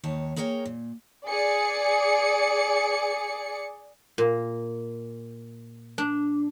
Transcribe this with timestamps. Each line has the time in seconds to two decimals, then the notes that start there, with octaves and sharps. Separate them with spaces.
0.03 D#2 D#3 C#5 A5
0.36 A#3 G#4 A#4 C#5 F#5 G5
0.66 A#2
1.27 G#4 D5 C#7
4.18 A#2
5.98 D4